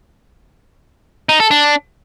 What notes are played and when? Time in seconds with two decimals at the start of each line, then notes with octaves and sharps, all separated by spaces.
1.29 D#4
1.40 A4
1.51 D4